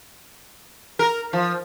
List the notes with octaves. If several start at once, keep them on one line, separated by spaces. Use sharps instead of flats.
A#4
F3